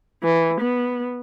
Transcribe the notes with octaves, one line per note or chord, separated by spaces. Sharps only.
E3
B3